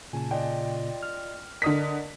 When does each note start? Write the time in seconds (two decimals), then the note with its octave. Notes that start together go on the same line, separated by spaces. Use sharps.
0.13 A#2 C#3 G#5 A5
0.31 F4 D5 D#5 G5
1.03 F6
1.62 D3 A#4 D5 D#5 D#6 B6